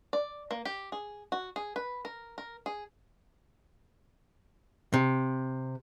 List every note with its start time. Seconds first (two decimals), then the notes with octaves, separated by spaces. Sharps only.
0.13 D5
0.51 A#3
0.65 G4
0.92 G#4
1.32 F#4
1.56 G#4
1.76 B4
2.05 A#4
2.38 A#4
2.66 G#4
4.94 C3